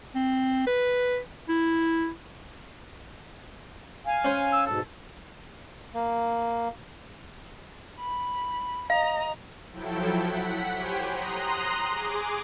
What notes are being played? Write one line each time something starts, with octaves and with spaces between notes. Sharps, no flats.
C4
B4
E4
F5 G#5
C#4 C5
E6
G#2 B2 A4
A#3
B5
D#5 F5 A#5
F3 F#3 E4 A4 G5
F#5 B6
G4 C5 C#5 G5 G#5 B5
A#5 C6 D#6 F#6
G#4 D6